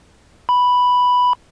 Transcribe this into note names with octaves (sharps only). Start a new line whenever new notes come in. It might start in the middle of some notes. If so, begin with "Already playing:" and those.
B5